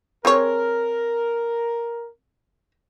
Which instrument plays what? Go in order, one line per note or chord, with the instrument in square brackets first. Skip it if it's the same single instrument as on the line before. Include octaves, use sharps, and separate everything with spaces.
[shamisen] C4 G#4 C#5 [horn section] A#4